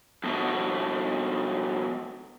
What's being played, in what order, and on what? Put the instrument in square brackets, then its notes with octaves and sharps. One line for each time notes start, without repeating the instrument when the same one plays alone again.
[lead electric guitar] F2 B2